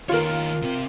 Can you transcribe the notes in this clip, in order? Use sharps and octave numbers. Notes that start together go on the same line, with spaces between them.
D#3 F4 A#4 C#5
C3 C4